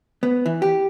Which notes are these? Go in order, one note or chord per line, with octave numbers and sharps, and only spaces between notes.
B3
E3
G4